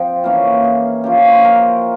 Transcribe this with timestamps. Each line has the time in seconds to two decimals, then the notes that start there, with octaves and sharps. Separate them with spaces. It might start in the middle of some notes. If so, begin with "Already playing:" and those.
Already playing: F3 C4 G5
0.24 E3 A#3 C#4 F5
0.64 G#4
1.04 F3 A#3 C#4 G4
1.18 C#5
1.31 C5
1.44 A#4